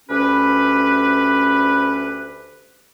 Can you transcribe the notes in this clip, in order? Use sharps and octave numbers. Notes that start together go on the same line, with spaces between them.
D2 C#4 G4 B4